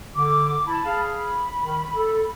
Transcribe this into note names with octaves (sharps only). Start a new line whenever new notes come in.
D3 D6
E4 A5 B5
G#4 F5
B5
D#3
A4